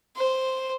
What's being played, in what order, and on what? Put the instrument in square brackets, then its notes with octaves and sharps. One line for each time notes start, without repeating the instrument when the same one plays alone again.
[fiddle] C5